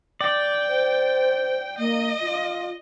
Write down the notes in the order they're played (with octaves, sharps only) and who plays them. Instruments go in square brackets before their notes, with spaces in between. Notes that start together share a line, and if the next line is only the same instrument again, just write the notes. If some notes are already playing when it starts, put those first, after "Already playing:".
[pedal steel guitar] D5 [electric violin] G5
[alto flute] C5
[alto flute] A#3 [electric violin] D#5
[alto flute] F4